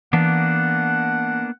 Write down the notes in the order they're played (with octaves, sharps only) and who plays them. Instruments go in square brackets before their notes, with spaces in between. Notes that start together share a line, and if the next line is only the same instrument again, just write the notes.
[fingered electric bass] E3 [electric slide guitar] A#3 B3 D4 [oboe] F#5